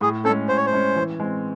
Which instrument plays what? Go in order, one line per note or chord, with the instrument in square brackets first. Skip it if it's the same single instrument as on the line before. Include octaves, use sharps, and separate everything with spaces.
[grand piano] A2 [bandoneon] G#4
[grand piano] C#4 [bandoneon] A4
[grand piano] G#3
[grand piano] A2 [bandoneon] C5
[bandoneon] C#5
C5
[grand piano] G#3 C#4
E3
G#3 C4